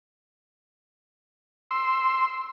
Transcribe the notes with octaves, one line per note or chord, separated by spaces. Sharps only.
C6 E6